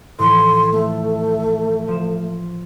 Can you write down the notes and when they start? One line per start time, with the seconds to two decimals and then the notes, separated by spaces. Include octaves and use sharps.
0.19 A2 E3 F3 C6
0.71 A3
1.88 F3 E7